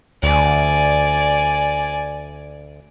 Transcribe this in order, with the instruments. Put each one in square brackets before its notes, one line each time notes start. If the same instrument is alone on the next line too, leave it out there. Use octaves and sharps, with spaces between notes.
[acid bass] D2 [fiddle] D5 G#5